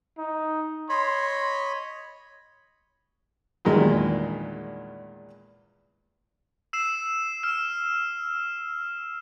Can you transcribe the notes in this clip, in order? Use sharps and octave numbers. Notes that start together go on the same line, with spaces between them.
D#4
C#5 D#5 B5 C6
E2 G2 A#2 D#3 G#3
E6 C7 E7
F6 E7